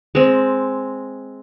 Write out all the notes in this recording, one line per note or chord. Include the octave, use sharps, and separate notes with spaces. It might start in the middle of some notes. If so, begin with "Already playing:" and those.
G#3 C4